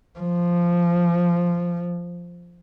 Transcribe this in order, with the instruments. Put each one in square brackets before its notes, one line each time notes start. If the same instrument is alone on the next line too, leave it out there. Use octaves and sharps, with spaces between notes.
[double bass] F3